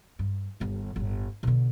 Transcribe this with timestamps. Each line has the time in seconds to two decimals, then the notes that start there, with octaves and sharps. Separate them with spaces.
0.19 G2
0.60 G1 D#2
0.96 G1 A2
1.43 B2 D3